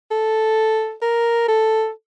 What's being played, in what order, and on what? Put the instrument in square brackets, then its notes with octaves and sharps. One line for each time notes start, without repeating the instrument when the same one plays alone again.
[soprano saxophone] A4
A#4
A4